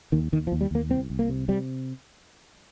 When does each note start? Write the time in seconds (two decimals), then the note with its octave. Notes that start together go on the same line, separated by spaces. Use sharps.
0.12 D#2 D#3
0.32 D#2 D#3
0.47 F3
0.52 D#2
0.61 G3
0.71 D#2 A#3
0.90 C2 C4
1.10 C2
1.19 A#3
1.29 C3
1.48 C3 G3